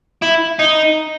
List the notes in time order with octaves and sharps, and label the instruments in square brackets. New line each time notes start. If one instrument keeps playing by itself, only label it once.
[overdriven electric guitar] E4
D#4